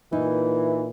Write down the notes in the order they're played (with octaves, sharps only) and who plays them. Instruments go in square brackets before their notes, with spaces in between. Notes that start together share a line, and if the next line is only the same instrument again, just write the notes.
[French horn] A#2 [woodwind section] E3 [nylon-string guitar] D#4